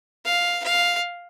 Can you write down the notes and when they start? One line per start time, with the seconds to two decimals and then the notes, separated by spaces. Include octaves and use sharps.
0.25 F5
0.64 F5